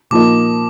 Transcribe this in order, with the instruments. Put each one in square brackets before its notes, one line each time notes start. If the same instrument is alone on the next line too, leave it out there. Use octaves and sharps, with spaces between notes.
[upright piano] A#2 F3 A#3 D#4 [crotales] D6